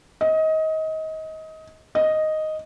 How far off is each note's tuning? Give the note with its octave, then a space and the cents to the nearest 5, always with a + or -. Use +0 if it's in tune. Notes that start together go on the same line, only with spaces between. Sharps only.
D#5 +25
D#5 +0